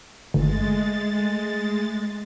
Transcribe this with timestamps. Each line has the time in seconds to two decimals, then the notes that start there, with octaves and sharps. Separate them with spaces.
0.34 G1 G#3 A3 A6